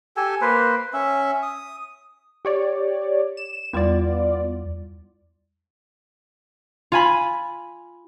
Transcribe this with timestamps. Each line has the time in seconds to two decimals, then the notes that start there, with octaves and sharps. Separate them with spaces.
0.17 G4 A4 G#5
0.41 A#3 B4 C5
0.93 C#4 E5
1.43 D#6
2.45 G4 C#5 D5
3.37 E7
3.73 E2 G3 B3 F4 D5
6.92 F4 G#5 B5